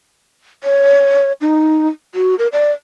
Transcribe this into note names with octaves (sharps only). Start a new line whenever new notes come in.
C#5
D#4
F#4
A#4
D5